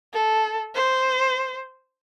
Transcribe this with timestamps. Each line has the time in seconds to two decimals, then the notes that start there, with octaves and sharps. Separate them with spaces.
0.13 A4
0.75 C5